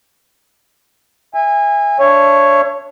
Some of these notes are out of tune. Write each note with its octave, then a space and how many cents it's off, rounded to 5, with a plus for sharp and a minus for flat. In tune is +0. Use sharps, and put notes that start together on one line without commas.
E5 +0 G#5 -25
D4 -10 C#5 +0 E5 +35